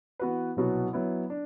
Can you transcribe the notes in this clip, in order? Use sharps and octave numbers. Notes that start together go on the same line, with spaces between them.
E3 B3 F#4 B4
C2 B2 F#3 B3 F#4
F#3 B3 E4
D4